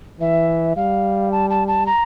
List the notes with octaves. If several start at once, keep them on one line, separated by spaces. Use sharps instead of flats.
E3 E5
G3 F5
A5
A5
A5
A#5